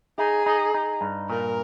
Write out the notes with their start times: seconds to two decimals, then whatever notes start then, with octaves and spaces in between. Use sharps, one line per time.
0.18 D#4 G#4
0.46 D#4
0.74 D#4
1.01 G2
1.30 A#2 A#4